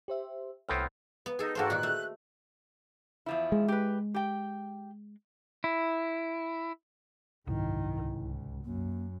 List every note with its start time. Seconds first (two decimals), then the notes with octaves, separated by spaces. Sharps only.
0.08 G4 C5 E5
0.69 C2 A2 B3 C4 A4 F6
1.26 B3
1.39 D#4 G#4 A4
1.55 G#2 A#3 F#4 A4 C5 G5
1.70 A#2 D#3 F#4 F#6
1.83 A3
3.26 E2 F3 E4
3.52 G#3
3.68 G4 B4
4.14 G4 G5
5.64 E4
7.47 F#1 C2 G#2 D#3 E4
8.02 C#2
8.65 F#2 A#3